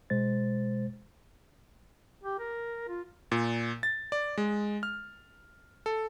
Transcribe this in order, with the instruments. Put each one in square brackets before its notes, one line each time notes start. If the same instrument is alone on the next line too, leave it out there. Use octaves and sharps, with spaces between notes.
[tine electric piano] B2 G#3 C5 A6
[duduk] G4
A#4
F4
[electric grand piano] A#2
A6
D5
G#3
F6
A4